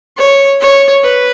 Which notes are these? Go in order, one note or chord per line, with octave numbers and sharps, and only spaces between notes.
C#5
C#5
B4